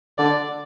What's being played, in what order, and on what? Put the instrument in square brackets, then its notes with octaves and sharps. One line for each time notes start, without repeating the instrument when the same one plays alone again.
[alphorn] D3 [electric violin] D5